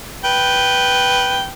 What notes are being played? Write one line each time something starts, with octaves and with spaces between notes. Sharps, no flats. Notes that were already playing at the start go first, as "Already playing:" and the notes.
B4 G5